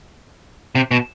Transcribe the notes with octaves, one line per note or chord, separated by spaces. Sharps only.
C3
B2